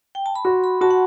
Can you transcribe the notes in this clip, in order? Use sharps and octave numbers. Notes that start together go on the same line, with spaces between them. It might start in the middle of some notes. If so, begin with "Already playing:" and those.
G5
A5
B5
F#4 C6
B5
F#4 A5
F#5